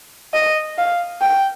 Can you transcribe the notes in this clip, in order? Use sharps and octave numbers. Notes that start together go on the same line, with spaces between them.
D#5
F5
G5